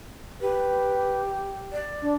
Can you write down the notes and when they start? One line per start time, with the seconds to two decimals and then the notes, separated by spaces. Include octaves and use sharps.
0.41 G4 B4
1.72 D5
2.01 D4